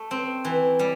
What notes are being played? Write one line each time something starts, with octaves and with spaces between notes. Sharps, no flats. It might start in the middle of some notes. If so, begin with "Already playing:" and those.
Already playing: A3
C4
E3
G3